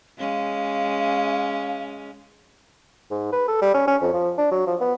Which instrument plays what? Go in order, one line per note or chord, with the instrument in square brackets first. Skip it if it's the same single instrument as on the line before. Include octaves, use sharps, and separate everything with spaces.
[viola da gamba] G#3 C#4 [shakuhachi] F5
[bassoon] G#2
B4
A4
G3
C#4
C#4
F2
F3
D4
F#3
F3
B3